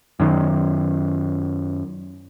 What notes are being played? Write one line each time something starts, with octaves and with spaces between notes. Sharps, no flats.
F#2 D#3